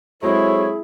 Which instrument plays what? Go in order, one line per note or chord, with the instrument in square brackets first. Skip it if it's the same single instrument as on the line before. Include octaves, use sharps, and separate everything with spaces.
[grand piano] F#3 G#3 C4 [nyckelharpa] E4 [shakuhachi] G#4 [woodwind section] A4 C5 C#5